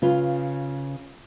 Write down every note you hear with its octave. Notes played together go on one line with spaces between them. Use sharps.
C#3 F4 B4